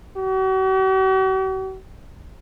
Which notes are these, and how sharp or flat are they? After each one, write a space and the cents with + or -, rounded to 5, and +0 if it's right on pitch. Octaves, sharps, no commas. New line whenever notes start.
F#4 +45